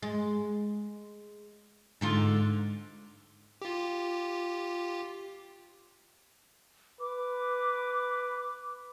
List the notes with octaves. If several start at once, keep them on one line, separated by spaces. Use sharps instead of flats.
G#3
G#2 D3 F4
F4 G4
B4 D6